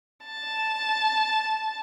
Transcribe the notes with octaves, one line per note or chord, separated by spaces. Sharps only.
A5